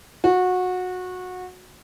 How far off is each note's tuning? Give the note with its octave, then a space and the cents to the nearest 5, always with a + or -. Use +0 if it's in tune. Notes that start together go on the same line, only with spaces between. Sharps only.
F#4 -20